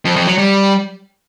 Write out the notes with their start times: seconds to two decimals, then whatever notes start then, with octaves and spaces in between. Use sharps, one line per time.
0.05 F2
0.16 F2
0.27 F#3
0.38 G3